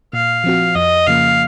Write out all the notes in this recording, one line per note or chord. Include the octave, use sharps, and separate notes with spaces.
A#2 F5
F3 C4 F#4
F2 D#5
C#3 F3 A#3 F5